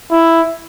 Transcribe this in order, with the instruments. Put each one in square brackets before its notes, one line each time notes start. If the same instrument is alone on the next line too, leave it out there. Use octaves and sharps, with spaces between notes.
[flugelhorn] E4